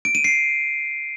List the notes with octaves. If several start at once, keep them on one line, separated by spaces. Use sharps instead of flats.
D7
D#7
C7